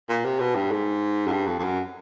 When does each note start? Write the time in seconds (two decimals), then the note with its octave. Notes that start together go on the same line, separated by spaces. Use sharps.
0.09 A#2
0.25 C3
0.40 B2
0.55 G2
0.71 G#2
1.27 F#2
1.32 G2
1.47 F2
1.59 F2
1.63 F#2